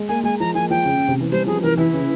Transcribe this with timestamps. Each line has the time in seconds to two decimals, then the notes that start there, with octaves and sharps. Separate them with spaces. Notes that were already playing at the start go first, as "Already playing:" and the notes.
Already playing: G#3
0.09 A#3 G#5
0.24 G#3 G#5
0.40 F3 A#5
0.55 F3 G#5
0.70 F3 G5
0.85 C#3
0.97 C#3
1.08 C3
1.20 E3
1.32 G3 C5
1.47 F3 G#4
1.63 E3 A#4
1.77 E3 E4
1.94 C#3